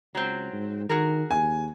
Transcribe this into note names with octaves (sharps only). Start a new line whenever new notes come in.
C#2 F#3 C4
G#2
D#3 F#4 G#4 A#4
D#2 G#5